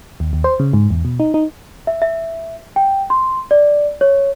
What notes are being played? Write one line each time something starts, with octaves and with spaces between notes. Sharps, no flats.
D#2
D#2
C5
C#3
G#2
E2
B2
D#4
D#4
E5
E5
G5
C6
D5
C#5